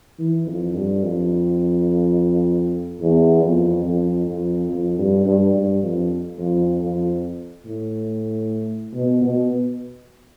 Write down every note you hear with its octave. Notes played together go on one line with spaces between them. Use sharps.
E3
F2
G2
F2
E2
F2
F2
F2
F2
G2
G2
G2
F2
F2
F2
A2
B2
B2